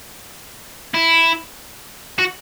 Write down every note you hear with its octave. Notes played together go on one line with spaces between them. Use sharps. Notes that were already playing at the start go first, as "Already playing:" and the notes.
E4
F#4